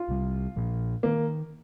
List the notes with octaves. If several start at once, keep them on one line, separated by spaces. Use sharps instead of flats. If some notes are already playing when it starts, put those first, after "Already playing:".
Already playing: F4
C2 C3 G3
A#1 A#2 F3 A#3
D#3 A#3